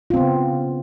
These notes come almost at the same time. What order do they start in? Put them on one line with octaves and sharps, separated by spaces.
F4 C4 B3 C#3